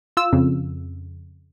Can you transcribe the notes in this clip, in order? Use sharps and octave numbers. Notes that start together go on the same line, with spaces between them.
F4 E6
F2 C#3